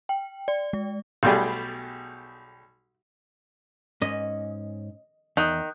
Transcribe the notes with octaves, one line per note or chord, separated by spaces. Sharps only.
G5
D5
G#3
B1 B2 G3 A3 G4 G#4
G#2 C#4 D#5
E2 D#3 D#6 F#6 G6